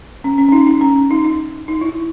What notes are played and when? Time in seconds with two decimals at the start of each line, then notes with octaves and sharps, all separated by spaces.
0.24 C#4
0.38 C#4
0.49 C#4
0.52 D#4
0.67 D#4
0.81 C#4
1.11 D#4
1.25 D#4
1.68 D#4
1.81 E4